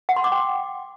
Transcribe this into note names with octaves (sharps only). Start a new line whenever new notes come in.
F#5
C6
D6
G5